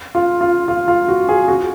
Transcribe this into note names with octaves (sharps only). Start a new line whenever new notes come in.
F4
F4
F4
F4
F#4
G#4
F#4